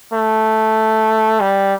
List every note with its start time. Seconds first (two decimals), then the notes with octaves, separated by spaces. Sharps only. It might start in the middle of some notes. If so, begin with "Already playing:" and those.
0.12 A3
1.40 G3